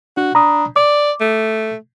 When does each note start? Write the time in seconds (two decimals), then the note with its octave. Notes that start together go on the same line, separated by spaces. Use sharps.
0.17 D4 F#4
0.35 D4 A#5 B5 D#6
0.76 D5 D6
1.21 A3